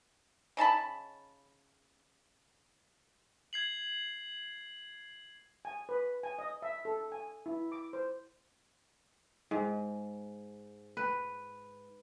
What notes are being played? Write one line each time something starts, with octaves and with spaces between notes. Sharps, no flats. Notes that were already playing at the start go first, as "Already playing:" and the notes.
C#3 D#4 A5 B5
G#6 C7 F#7
G#5
B4
G#5
D#5
E5
A4
G#5
E4
D6
C5
G#2
B4